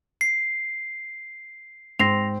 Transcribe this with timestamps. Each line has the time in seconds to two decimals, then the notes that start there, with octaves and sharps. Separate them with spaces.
0.21 C7
1.99 G#2 C4 A#6 C7 F7